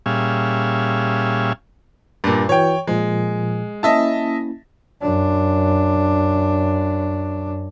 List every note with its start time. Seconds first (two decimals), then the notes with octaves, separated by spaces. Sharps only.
0.06 A#2 G3 C#4 G#4 E5 F5
2.24 G2 A#2
2.49 E3 F#4 C#5 G5
2.87 A#2 F3 G#3
3.83 A#3 C#4 E4 D#5 E5 A5
5.01 F#2 D4